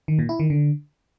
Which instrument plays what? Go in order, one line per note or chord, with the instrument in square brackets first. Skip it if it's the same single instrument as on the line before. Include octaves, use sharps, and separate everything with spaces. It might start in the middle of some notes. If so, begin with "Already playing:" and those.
[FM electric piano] D#3
A#2
E4
D#3
D3